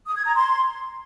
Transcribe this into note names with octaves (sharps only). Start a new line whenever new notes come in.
D#6
G#6
A#5
C6